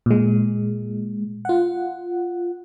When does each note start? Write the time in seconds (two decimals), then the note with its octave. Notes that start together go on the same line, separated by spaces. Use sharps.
0.06 A#2 G#3
1.45 F4 F#5